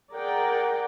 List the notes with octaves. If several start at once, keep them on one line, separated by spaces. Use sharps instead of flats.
G#4 A#4 D5 F#5 G5